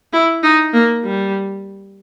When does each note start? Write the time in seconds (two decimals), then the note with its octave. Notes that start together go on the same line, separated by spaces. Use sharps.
0.13 E4
0.43 D#4
0.73 A#3
1.04 G3